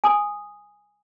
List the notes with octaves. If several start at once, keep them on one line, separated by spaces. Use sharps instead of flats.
G#5 D#6